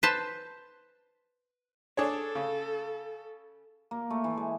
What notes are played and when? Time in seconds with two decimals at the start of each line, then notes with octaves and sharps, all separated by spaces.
0.03 B4 C5 A5
1.97 D4 G#4 A4 C#5
2.35 C#3
3.91 A#3
4.10 A3
4.24 E3
4.37 G#3